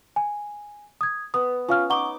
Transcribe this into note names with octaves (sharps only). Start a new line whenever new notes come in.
G#5
D#6 G#6
B3 D#6
C#4 F4 F5 F6
D#4 F#5 C#6 D6 G7